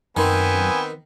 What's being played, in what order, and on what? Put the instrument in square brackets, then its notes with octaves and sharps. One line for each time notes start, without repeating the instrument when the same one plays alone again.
[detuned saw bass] F#2 [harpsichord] D#3 [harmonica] B3 C4 [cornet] G#5